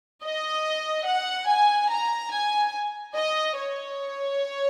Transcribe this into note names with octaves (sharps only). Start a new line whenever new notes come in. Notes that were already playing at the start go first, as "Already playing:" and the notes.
D#5
F#5
G#5
A#5
G#5
D#5
C#5